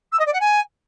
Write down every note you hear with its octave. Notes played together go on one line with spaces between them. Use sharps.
E6
D#5
D5
F#5
G#5